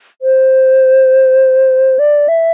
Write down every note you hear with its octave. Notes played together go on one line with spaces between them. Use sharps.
C5
D5
E5